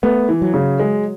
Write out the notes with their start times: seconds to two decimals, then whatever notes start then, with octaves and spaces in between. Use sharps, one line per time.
0.03 A3 B3
0.29 E3
0.42 F#3
0.54 C#3
0.80 G#3